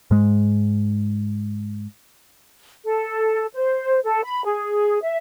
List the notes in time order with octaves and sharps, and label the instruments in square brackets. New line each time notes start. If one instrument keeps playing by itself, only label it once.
[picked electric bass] G#2 G#3
[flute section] A4
C5
A4
B5
G#4
E5